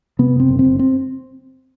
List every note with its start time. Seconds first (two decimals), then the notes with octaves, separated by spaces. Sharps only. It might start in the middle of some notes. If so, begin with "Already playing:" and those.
0.19 C3 B3
0.34 F#1
0.40 C4
0.49 F#1
0.59 C4
0.64 F#1
0.79 C4